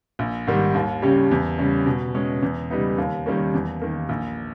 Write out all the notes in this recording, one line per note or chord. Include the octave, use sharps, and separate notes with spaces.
A#1
G#2 D#3 G3
D#2
C#3 G3 C#4 G4
E2
C#3 G3 C#4
B2
G#3 C#4
E2
C#3 G3 B3 D#4
D#2
D#3 G3 A#3 C#4
E2
D#3 A#3
A#1